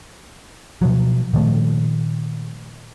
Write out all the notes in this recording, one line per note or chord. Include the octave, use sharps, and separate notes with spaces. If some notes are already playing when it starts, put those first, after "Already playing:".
B2 F3 F#3
A#2 D#3 F3 A3